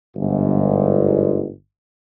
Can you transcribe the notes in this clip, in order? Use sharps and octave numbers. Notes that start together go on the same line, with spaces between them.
G1 G#2